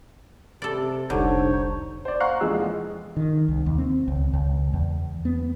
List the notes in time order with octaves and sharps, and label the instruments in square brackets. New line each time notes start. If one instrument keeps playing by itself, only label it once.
[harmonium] C3 [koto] A4 D5
[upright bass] F1 C2 [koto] D3 [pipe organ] D4 D#4 C5 [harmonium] C#5
[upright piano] C5 D5
F5 F#5 A#5 C6 C#6 F#6
F1 E2 G#3 G#4 E6
[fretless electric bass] D#3
C2
D#2
C4
C#2
C#2
E2
B3